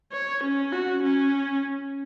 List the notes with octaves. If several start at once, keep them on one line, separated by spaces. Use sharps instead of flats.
C#5
C#4
F#4
C#4